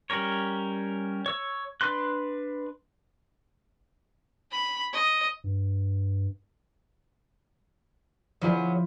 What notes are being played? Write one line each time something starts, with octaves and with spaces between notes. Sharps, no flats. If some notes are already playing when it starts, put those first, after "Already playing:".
G3 C#4 A#4 C#5
C#5 E6
D4 B4 C6 F#6
B5
D#5
G2
F3 F#3 B3 E4 G#4